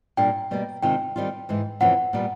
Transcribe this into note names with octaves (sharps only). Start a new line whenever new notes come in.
A#2 G3 A#3 D4 G5
B2 G3 A#3
C3 D#3 G#3 C4 F4 G5
D#3 G3 C4 F4
G#2 E3 G#3
F2 C#3 E3 F#5
A#2 G3 B3